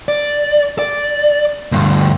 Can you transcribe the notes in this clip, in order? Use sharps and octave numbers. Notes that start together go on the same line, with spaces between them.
D5
D5
D2 G2